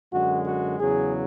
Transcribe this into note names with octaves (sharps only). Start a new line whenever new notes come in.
F#2 D3 G#3 F#4
F#4
E2 C#3 F#3 G#4